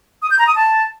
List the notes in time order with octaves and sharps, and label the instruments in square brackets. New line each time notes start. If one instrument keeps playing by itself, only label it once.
[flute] D#6
G6
A#5
D#6
A5